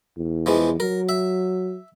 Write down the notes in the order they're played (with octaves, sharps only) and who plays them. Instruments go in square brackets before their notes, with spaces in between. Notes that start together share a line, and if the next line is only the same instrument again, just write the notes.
[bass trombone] E2
[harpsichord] E3 F3 G#3
[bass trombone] F#3 [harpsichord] A#4
[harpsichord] E5